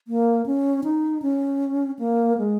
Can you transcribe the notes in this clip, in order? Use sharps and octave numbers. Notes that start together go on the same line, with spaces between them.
A#3
C#4
D#4
C#4
A#3
G#3